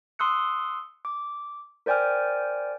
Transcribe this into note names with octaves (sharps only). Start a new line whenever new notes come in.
C6 D#6 E6 F#6 C#7
D6
A#4 C5 D5 G5 G#5 F6